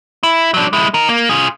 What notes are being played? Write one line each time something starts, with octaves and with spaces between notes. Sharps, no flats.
E4
F#3 D4
G#3 E4
D#4 A#4
A#3
F4 G#4